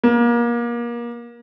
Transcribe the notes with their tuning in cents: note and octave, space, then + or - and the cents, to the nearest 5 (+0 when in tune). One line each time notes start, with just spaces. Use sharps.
A#3 +30